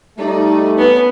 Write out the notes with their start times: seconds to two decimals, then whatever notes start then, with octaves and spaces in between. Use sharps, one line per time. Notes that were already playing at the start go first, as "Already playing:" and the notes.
0.18 G3 A3 D#4 D5
0.78 B3 C#4